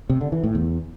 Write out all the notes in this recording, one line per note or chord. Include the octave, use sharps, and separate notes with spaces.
C3
D3
E3
A2
E2